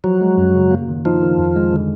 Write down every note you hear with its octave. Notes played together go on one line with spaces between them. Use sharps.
F3 F#3
G#3
F#2
C#3
A#3
D#3
F3 D#4
D#3
F2
G#3
D3